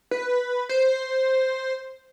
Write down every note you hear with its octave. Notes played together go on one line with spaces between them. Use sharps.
B4
C5